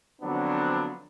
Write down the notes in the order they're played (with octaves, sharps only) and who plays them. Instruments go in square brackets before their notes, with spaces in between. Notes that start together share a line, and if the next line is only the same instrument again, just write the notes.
[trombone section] D3 F3 F#3 B3 C4 D4